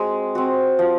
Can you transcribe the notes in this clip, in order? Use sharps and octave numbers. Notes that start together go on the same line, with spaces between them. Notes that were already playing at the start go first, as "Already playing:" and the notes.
Already playing: G#3 C4 F#4
C4 F#4
F3